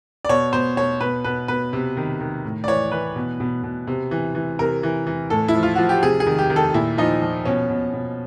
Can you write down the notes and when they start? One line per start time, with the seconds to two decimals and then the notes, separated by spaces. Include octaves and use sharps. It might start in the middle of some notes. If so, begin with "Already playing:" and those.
0.25 D5
0.29 B2 C#5
0.53 B2 C5
0.77 B2 C#5
1.01 B2 B4
1.24 B2 B4
1.48 B2 B4
1.73 C3
1.97 D#3
2.20 D#3
2.44 A2
2.64 D5
2.68 E3 C#5
2.92 E3 B4
3.16 B2
3.40 B2
3.63 B2
3.87 C3
4.11 E3
4.35 E3
4.59 C3 A#4
4.83 E3
5.07 E3
5.30 A2 A4
5.48 E4
5.54 F3
5.63 F4
5.75 F3 F#4
5.89 G4
6.03 C3 G#4
6.20 G#4
6.26 D#3
6.39 G4
6.50 D#3
6.56 A4
6.74 A#2 E4
6.98 F3 D#4
7.22 F3
7.45 B2 C#4
7.70 B2
7.93 B2